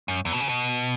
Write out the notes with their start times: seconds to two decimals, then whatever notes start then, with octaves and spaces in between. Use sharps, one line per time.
0.08 F#2
0.25 E2
0.33 B2
0.40 C#3
0.49 B2